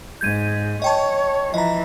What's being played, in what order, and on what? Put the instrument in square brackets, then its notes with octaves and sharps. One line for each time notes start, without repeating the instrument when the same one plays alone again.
[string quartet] G#2 [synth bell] G6 G#6 D#7
[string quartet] C#5 [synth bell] D#5 G5 A5
[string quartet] E3 F3 [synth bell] D#5 A#5